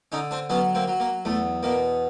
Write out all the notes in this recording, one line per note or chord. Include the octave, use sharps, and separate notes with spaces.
D3 C#4 D#4
C4 D4
F#3 B3 C#4
A#3 C4
F#3
A#3
E2 A3
B2 A#3